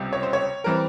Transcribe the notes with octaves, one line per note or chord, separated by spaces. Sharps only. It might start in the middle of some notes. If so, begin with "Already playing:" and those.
Already playing: C#2 C3 G3
C#5
C5
C#5
E3 G3 C4 A#4